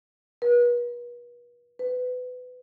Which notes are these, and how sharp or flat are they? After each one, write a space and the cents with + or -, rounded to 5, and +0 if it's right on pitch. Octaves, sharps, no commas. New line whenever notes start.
B4 -40
B4 +25